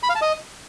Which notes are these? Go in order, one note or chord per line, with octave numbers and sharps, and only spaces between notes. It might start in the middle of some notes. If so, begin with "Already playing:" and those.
B5
F5
A5
D#5